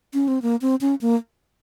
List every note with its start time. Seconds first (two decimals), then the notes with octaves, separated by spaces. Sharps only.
0.14 C#4
0.28 C4
0.42 A#3
0.62 C4
0.81 C#4
1.01 A#3